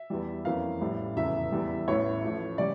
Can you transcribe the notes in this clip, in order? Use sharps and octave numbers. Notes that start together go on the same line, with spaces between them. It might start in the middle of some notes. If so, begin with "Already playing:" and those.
Already playing: E5
E2 E3 G3
F2 E3 A#3 C#4 F5
A1 A2 G3
F1 E2 C#3 E3 E5
E2 E3 G3
A1 A2 E3 C#5
A1 A2 F3 A3
C#3 G3 D5